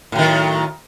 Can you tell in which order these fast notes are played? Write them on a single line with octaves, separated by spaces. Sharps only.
A2 F#3 D#3